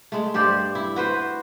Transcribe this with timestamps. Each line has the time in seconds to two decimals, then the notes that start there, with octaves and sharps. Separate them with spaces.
0.12 G#3 A3
0.34 G2 G4 C5 D5
0.75 E4
0.96 F#4 B4 C5